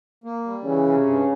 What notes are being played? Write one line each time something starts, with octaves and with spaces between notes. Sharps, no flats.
A#3
G3
C#3 E3
C3
G2